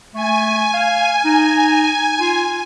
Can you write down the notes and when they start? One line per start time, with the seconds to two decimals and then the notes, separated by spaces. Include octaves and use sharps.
0.14 A3 G#5
0.74 F5
1.25 D#4
2.20 F4